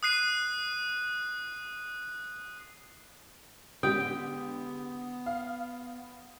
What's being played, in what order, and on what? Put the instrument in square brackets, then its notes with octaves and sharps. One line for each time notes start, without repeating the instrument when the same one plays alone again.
[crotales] D#6 F#6 C7 D#7
[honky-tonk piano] D3 G#3 G4 [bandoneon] B3 [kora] G5 [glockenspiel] D#6
[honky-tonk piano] F5